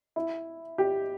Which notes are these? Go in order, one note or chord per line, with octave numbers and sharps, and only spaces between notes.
E4
G4